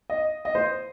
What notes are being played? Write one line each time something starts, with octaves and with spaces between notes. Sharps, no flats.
D#5
D#5
C5